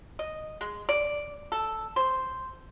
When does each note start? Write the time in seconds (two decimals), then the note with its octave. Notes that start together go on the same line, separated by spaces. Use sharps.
0.19 D#5
0.61 G#3
0.89 D5
1.52 A4
1.96 C5